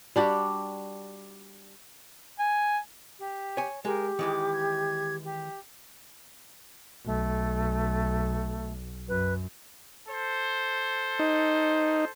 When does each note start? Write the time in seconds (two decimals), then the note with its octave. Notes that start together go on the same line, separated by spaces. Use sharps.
0.16 G3 D4 F#4 G4
2.39 G#5
3.19 G4
3.57 C#5 G#5
3.85 G#3 G4 A#4
4.19 D#3 E3 G#3 D6
4.53 G#6
5.25 G4
7.06 B1 A3
9.09 F#2 B4
10.08 A4 C5
11.19 D#4